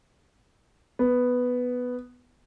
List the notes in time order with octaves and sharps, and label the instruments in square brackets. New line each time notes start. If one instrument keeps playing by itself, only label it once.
[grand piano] B3